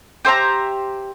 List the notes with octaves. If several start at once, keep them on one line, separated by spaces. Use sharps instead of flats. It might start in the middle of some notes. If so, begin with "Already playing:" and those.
G4 C5 E5 A#5